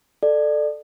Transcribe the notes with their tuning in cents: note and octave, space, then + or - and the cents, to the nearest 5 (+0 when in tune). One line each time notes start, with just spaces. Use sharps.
A4 +0 D5 +25